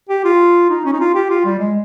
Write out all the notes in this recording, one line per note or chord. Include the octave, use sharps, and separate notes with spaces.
G4
F4
D#4
C#4
D#4
F4
G4
F4
G3
G#3